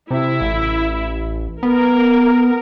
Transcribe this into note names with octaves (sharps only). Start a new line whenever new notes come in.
C3 E4
A1
B3 A#4